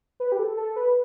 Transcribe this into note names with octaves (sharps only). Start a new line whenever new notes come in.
B4
G4
A4
A4
B4